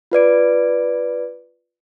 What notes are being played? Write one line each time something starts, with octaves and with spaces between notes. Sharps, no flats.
F4 B4 D5 D7